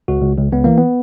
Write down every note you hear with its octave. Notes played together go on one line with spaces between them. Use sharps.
C#2 F#4
C#2
C#2
C#2 B3
E3 A#3
B3